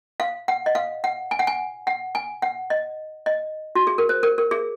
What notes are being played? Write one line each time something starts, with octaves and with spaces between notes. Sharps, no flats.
F5
F#5
D#5
F5
F#5
G#5
F#5
G#5
F#5
G#5
F#5
D#5
D#5
F#4
G#4
A#4
C5
A#4
A#4
G#4